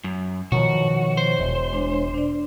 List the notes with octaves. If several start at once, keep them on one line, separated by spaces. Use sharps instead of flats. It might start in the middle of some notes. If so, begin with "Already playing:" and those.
F#2
B2 D#3 F3 F#4 C#5
C5
E1
G#3 D4 C#5
D4 D5